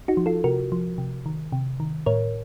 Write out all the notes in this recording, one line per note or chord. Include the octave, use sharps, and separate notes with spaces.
D#4 F#4
F3
F4 A4
C3 F#4 A#4
F3
C3
D#3
C3
D#3
A2 A#4 C#5